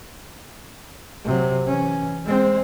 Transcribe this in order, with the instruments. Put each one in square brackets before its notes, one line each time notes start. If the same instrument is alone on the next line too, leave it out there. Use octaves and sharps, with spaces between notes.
[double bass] C3 F#3
E3 C#4
G#3 C4